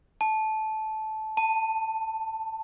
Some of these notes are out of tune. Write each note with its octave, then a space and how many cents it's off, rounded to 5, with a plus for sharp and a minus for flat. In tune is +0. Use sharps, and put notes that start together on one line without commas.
A5 -15
A5 +15